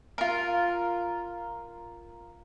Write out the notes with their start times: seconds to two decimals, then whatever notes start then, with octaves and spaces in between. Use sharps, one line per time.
0.18 F4 A#4